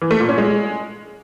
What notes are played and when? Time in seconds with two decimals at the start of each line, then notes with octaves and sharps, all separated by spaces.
0.02 E3
0.11 A3
0.20 A#2
0.29 C#4
0.38 G#3